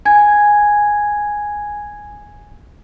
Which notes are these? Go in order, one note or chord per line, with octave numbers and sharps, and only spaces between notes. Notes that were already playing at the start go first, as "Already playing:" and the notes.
G#5 G#6